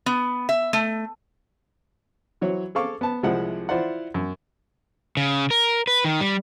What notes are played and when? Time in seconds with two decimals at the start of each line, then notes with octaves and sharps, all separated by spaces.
0.06 B3
0.49 E5
0.73 A3
2.41 E3 F#3 C5 C#5
2.75 G#4 A4 F5 C#6 D6
3.01 B3 A5
3.23 C2 C3 F3 G#3 E4 F#5
3.69 E4 F4 C5 D5 F#5
4.14 F#2
5.17 C#3
5.51 A#4
5.87 B4
6.05 D#3
6.20 G3